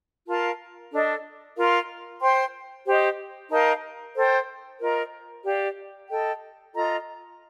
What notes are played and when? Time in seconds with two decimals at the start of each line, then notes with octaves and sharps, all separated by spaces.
0.27 F4 A#4 F5 A5
0.92 D4 A4 D#5
1.56 F4 A#4 F5 C6
2.21 C5 G5 C6
2.85 G4 C5 D#5
3.51 D#4 A#4 F5 A5
4.14 A4 C5 G5
4.80 F4 A#4 D#5 A#5
5.45 G4 D5 F5
6.10 A4 D#5 G5
6.74 F4 A4 D#5 A#5